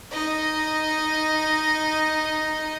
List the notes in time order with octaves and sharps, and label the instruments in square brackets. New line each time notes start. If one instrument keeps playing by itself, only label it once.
[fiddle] D#4 D#5